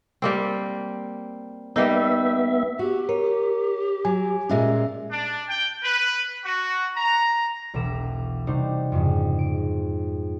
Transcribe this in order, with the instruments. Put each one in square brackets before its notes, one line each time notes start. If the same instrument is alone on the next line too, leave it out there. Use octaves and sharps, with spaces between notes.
[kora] G3 A#3 C4
[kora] G3 A#3 D#4 [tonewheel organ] B3 E5
[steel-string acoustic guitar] F#4 [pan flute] G4
[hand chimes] A#4 [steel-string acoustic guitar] C#5
[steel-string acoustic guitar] F#3 [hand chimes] G#5
[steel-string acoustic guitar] A#2 G#3 F4 [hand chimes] C#4 E5
[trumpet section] D4
G5
B4
F#4
A#5
[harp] E1 B1 B2 B6 E7
C3 G3 D#4 F#4 C5
F2 G#2 C#3
D7